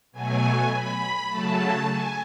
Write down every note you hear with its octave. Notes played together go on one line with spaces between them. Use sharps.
B2 F#3 A3 G#5
B5
C#3 F#3 A3 A5
G#5